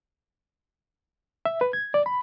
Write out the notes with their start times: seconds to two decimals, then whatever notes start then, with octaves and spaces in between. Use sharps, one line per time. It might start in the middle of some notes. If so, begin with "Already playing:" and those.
1.45 E5
1.61 B4
1.73 G#6
1.94 D5
2.06 B5